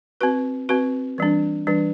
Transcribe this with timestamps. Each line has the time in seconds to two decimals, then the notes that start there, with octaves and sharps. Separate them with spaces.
0.21 C4 F#4 B4
0.69 C4 F#4 B4
1.18 E3 G3 D4
1.67 E3 G3 D4